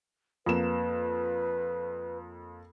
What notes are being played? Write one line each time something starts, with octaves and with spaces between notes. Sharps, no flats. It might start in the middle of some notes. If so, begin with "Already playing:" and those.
F2 A#3 B4 E7